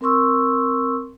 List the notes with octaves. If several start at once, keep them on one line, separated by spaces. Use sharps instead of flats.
C4 A#4 C6 C#6 E6